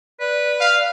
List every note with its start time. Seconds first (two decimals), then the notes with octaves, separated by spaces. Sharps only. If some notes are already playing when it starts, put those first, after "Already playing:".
0.20 B4 D5
0.60 F5